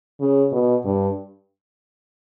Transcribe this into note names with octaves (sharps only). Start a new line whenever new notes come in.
C#3
B2
G2